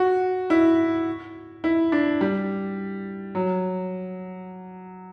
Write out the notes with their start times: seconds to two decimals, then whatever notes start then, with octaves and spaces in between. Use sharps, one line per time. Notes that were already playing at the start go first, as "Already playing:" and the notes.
Already playing: F#4
0.50 E4
1.64 E4
1.92 D4
2.21 G3
3.35 F#3